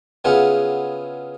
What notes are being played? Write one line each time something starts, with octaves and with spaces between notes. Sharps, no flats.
C#3 B3 E4 F4 G#4 F#5